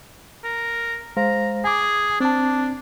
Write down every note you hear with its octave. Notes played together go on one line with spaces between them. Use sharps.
A#4
G#3 C5 F5 A#5
G#4 G#5 D6
C4 D4 A5